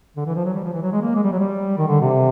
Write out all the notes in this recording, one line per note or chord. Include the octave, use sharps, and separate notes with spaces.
D3
E3
F3
F#3
G3
F3
E3
F#3
G#3
A#3
G#3
G3
F#3
G3
D#3
D3
C3